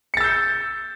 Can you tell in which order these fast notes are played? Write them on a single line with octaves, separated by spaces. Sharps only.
C#7 A6 E6 G6